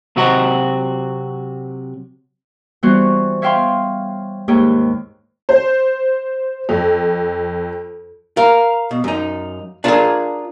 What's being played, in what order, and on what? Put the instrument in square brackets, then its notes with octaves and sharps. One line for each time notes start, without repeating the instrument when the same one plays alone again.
[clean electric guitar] C3 F#3 C4 F#4
[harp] E3 G3 B3 F#4 C5 C#6
C#5 E5 F5 G5 B5 C6
D#2 G#2 G4 G#4 C#5 G5
[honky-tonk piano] C5
F2
[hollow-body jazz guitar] A#4 [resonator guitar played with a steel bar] F5
[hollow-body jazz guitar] B2
F#2 D#4
[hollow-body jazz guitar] D4 F4 A#4 [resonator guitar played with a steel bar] G#4 A5